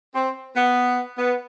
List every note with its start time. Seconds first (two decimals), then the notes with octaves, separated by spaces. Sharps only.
0.14 C4
0.56 B3
1.18 B3